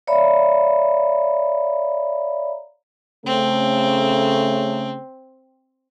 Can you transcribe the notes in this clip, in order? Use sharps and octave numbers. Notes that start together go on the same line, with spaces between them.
C#5 D5 E5 F5 A#5 B5
C#3 A3 C4